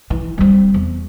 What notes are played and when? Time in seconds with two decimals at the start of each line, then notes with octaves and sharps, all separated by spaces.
0.10 E3
0.38 G3 C4
0.74 E2